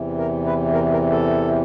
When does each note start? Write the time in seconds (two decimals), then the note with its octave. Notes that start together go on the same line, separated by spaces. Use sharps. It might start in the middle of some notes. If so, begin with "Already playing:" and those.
Already playing: E2 C3 E3
0.18 A#4
0.46 B4
0.74 A#4
0.92 A#4
1.11 A4